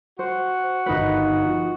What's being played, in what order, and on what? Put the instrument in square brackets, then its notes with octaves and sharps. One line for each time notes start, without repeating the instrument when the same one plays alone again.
[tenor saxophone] F#4 [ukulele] C5
[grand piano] G1 D#3 F#6 [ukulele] D#4 B4
[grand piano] F3